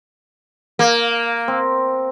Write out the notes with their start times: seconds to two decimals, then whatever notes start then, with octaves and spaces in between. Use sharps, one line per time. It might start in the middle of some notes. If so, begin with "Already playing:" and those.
0.79 A#3
1.48 C4